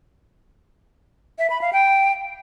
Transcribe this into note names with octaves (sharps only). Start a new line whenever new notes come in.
E5
B5
F5
G5